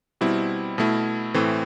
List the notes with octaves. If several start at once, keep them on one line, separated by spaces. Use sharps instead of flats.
B2 G3 C4 E4
B2 A3 E4
A2 E3 A3 C4